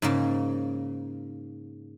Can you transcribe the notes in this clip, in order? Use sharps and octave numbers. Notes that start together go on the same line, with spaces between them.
G#2 C#3 A#3